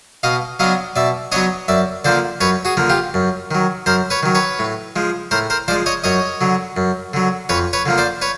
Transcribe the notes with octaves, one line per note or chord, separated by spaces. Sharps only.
B2 D#5 F5
F#3 B3 D4 D#5 F5
B2 D5 E5
F#3 B3 D4 C#5 D#5
F#2 D5 E5
D3 F3 A#3 C5 D5
F#2 B4 C#5
F#4 G#4
D3 F3 A#3
F4 G4
F#2
D#3 F#3
F#2 A#4 C5
B4 C#5
D#3 F#3
B4 C#5
A2
F3 G#3
A2 A#4 C5
A#4 C5
F3 G#3 C5 D5
C#5 D#5
F#2 C#5 D#5
D3 F#3
F#2
D3 F#3
F2 B4 C#5
B4 C#5
D3 F3 A#3
C5 D5
B4 C#5